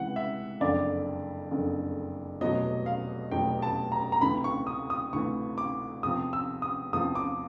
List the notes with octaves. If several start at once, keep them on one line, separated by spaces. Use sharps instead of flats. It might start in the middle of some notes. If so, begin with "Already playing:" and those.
Already playing: C#2 C3 E3 F#5
E5
F#1 F2 D3 D5
F#1 F2 D3
F1 E2 B2 F#3 D#5
F5
F1 E2 B2 F#3 G5
A5
A#5
A#5
D2 C3 E3 B5
C#6
D#6
D#6
D2 C3 E3 C#6
D6
E2 C3 F3 D#6
E6
D#6
E2 C3 F3 D#6
D6